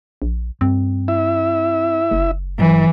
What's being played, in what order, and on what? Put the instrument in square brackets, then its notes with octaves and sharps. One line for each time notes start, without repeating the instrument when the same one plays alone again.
[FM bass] A#1
[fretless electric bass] G2 [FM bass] C4
[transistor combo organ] E4 E5
[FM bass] F#1
[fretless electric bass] G1 F#3 [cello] E3